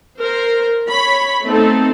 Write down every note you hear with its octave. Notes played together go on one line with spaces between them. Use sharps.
A#4 C5
C#5 B5
A3 B3 C4 D#4 A4